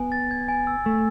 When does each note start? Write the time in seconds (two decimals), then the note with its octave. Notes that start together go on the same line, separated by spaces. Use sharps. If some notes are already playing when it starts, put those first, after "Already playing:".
Already playing: B3 G#5
0.12 A6
0.31 G#6
0.49 G#5
0.67 E6
0.85 A3 E6